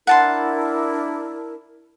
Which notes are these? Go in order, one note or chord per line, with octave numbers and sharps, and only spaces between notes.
D4 E4 A#4 F#5 A5 C6